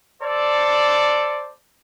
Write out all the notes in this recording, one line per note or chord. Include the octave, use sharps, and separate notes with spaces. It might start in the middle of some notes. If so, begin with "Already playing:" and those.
A4 C5 D5